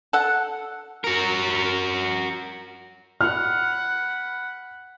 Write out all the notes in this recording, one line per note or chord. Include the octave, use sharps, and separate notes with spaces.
A4 F#5
F#4 A#4
F#5 B5 F6